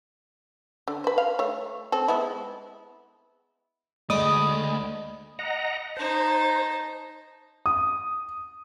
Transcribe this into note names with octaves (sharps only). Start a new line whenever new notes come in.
D3
B4 C5
F5
A3 C#5
C4 A4
G#3 B3 E4
D2 G#3 A3 D5 D#5 B5 D#6
D#5 F#5 A#5
D#4 C5 A5
D#6